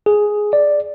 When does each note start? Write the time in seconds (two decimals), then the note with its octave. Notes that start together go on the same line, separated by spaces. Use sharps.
0.06 G#4
0.53 D5